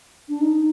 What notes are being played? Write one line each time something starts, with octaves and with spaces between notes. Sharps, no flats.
D4
D#4